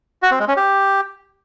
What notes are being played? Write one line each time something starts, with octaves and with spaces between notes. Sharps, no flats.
F#4
C4
G#3
C#4
G4